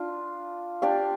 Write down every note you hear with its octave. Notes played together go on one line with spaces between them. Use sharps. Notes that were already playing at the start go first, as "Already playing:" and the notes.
Already playing: D4 F4
D4 G4 D5 F5